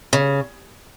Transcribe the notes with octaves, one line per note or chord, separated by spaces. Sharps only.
C#3